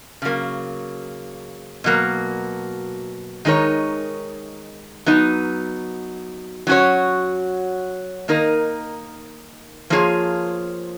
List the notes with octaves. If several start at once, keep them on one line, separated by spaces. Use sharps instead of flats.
C#3 F#3 A#3
B2 F#3 A#3
D#3 G#3 D#4 A#4 C#5
F#3 B3 D#4
F#3 C#4 F#4 C#5
D#3 A#3 D#4 A#4 D#5
F3 A#3 F4 G#4 C#5